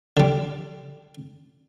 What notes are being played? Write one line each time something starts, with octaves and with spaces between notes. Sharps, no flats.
D3 G3